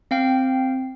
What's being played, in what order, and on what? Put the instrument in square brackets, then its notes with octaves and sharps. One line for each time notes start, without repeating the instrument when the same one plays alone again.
[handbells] C4 F5 G5